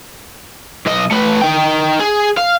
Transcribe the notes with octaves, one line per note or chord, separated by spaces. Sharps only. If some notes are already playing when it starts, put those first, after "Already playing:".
B1 D#5
A3 B4
D#4 G5
G#4
F5